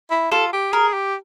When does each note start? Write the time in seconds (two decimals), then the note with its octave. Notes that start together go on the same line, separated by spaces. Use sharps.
0.11 E4
0.32 F4 A4
0.53 G4
0.73 G#4 A#4
0.93 G4